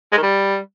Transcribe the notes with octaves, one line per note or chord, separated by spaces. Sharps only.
G#3
D#3
G3